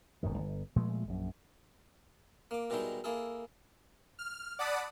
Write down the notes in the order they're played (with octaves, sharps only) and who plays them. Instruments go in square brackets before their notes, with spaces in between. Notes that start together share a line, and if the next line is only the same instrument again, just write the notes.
[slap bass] D1 G1 F#2 D#3
G1
A#2 F3 G#3 A3
A#1 F#2
[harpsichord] A#3 D6
B2 D#3 G3 G#3 D#4 E4
A#3 E4 G#4 A4
[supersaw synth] F6
D5 F#5 A5 B5 D6 D#6